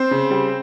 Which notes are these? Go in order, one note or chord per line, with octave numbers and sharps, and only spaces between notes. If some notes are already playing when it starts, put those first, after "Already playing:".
Already playing: C4 C5
C#3
G3